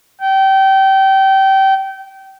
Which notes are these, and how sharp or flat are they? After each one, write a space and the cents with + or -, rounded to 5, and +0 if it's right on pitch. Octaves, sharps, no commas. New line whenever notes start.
G5 -25